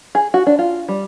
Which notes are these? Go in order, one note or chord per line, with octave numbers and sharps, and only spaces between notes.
G#4
F#4
D4
F4
G3